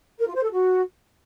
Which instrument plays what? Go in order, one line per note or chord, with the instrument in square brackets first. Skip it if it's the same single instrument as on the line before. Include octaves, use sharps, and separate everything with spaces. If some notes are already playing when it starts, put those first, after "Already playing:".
[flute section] A#4
F4
C5
A4
F#4